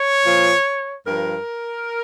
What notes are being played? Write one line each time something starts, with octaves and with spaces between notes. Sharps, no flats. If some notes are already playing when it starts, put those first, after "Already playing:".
Already playing: C#5
A#2 F3
G2 F3 A#4